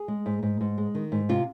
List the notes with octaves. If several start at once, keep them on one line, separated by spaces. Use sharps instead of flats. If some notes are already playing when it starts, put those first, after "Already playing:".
Already playing: G#4
G#3
G#2
G#2
G#2
G#3
D#3
G#2
C3 F4